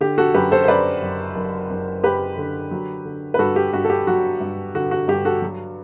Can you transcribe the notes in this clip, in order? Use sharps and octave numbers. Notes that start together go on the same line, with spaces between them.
D3 G4
F#4 A4
F#2 G4 B4
A4 C5
C5
F#2 B4 D5
F#1
F#1
F#1
F#1 G4 B4
D3
F#3
D3
B4
G2 F#4 A4
G4
G2 F#4
A4
G4
F#3 F#4
G2
D3 F#4
F#4
G2 G4
F#4 A4
F#3